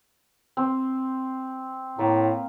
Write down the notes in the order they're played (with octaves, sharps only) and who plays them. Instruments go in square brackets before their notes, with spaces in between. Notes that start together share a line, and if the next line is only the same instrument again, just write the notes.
[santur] C4
[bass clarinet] A2 [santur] A#3